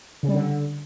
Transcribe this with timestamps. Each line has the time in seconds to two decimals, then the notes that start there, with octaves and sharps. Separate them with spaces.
0.23 C#3
0.28 G3
0.34 D3